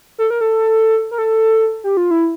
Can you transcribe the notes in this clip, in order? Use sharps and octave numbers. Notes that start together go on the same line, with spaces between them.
A4
A#4
A4
A#4
A4
G4
F4
E4